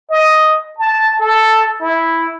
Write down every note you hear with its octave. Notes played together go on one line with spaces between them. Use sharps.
D#5
A5
A4
E4